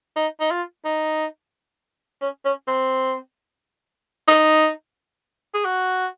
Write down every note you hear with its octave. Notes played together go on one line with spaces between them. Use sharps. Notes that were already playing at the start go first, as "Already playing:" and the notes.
D#4
D#4
F4
D#4
C#4
C#4
C4
D#4
G#4
F#4